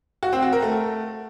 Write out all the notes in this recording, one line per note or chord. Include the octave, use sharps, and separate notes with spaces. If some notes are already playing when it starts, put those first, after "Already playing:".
F#4
C4
F#4
A#4
A3